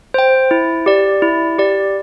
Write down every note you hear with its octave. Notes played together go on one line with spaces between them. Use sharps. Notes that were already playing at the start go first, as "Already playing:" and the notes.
C5 G5
E4
G4 D5
E4
G4 D5